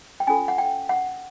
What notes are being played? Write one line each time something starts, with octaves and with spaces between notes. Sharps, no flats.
G5
C#4 F4 A4 G#5
F#5
G5
F#5